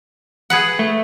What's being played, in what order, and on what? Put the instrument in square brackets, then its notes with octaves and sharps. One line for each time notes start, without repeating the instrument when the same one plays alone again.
[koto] G#4 B4 F#5
[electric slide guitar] A3